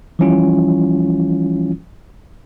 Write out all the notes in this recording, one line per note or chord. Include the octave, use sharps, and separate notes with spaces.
E3 F3 G3 C#4 E4 F4